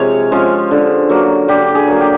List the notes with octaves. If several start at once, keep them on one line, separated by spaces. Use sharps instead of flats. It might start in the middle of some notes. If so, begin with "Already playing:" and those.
Already playing: C3 F3 G#3 C#5 F5
F3 G#3 C#4
D3
F#3 A#3
D3 G4
G#4
F#3 A#3
G4